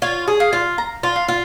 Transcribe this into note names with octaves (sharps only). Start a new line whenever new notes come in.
F4 C#5
G#4
F5
F4
A#5
F4
F5
F4